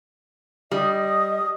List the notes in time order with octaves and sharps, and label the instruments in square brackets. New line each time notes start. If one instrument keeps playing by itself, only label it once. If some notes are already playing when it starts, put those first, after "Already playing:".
[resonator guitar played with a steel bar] G3 [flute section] D#5 D#6